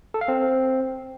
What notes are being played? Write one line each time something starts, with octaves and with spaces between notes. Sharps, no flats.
A4
F5
C4